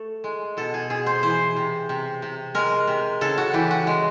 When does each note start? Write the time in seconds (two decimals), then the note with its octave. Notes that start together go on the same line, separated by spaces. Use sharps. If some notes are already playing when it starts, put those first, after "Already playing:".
Already playing: A3 A4
0.24 G#3
0.57 B2 A4
0.74 G#4
0.90 B2 G#4
1.06 C5
1.23 E3 C5
1.56 C3
1.89 C3
2.22 C3
2.55 G#3 A#4
2.87 C3
3.21 C#3 A4
3.38 F#4
3.54 E3 G4
3.71 F#4
3.87 G#3